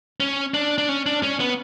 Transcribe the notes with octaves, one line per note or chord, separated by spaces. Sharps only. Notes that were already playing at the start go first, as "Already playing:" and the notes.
C#4
D4
D4
C#4
D4
C#4
B3